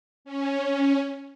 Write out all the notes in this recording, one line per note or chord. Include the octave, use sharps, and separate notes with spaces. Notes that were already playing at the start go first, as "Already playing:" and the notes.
C#4